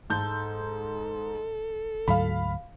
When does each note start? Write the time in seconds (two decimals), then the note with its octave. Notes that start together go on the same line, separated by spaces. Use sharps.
0.10 G#2 A4 G6
2.08 D2 G#2 F#3 F5 B5